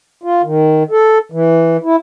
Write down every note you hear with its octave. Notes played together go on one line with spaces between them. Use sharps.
F4
D#3
A4
E3
E4